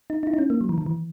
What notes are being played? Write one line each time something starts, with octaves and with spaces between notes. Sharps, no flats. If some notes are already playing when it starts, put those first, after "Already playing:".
D#4
D#4
E4
D#4
C#4
A#3
F#3
E3
D#3
E3